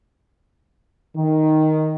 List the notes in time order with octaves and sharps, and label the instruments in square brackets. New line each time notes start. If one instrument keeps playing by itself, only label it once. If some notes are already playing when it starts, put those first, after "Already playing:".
[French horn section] D#3